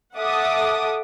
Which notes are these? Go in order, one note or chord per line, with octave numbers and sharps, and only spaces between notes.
A4 E5 F#5 A5 D6 D#6